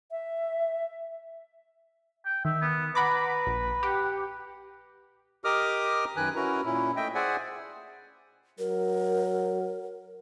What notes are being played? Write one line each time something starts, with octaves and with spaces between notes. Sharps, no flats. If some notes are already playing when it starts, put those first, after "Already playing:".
E5
G5
D#3 E5
B3
B4 F#5 A#5 B5 D6
A#1
G4 F#5
G4 A#4 D#5 D6 D#6 F6
F#2 D#3 B4 G#5 F#6
C#4 E4 F#4 A#4 B4 A#5
A#2 C#4 E4
A3 D#5 E5 G5
G#4 C5 D5 E5 F#5 G#5
F#3 A#4